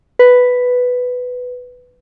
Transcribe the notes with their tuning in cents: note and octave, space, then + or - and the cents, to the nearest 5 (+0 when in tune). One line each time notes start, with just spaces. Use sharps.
B4 +5